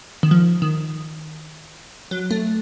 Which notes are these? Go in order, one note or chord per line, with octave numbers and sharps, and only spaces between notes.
D#3
F3
D#3
F#3
A3